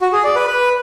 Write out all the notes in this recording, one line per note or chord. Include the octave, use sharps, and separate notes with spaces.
F#4
G#4
D5
B4
B4